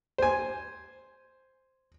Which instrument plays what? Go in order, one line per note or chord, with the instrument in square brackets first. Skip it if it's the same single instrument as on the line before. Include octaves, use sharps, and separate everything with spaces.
[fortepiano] C5 G#5